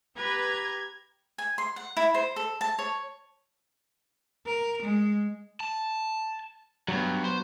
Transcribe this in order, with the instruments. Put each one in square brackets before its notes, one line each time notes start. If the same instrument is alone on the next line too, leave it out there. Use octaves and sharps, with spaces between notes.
[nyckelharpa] G4 A#5 [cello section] B4 [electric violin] G#6
[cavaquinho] G#5
C6
F#5
E4
C5
A4
A5
C#5
[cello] A#4
G#3
[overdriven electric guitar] A5
[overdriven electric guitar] G2 [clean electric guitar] F#3 B3
[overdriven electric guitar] C5